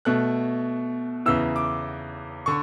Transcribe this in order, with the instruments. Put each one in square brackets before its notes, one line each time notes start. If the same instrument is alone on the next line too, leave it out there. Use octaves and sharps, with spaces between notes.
[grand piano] B2 A3 F#6
E2 C#3 E3 E6
D6
D3 C#6